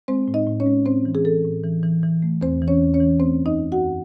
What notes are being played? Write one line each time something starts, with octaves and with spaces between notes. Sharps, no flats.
G#3 C4 C5
A2
D#4 D#5
A2
C#4 C#5
G#3
A2 C4 C5
E3
G#4
E3 A4
A2
E3
E3
E3
A3
E2 C4 C5
E3
C#4 C#5
E2
C#4 C#5
E3
A3 C4 C5
F#2
D#4 D#5
D#4
F#4 F#5
F#2